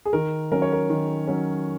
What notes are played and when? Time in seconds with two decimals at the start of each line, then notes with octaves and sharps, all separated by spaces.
0.05 G#4
0.13 D#3 A#4
0.51 F#3 C#4 A#4
0.62 C#5
0.73 A#4
0.90 D#3
1.27 F#3 C#4